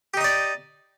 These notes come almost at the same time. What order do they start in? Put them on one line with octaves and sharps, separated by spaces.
G4 D#4 D#5 D5